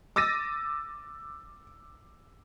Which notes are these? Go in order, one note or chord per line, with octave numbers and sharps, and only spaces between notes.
D6 E6 A6 A#6 D#7